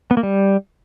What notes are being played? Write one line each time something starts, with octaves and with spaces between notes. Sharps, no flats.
B3
A#3
G3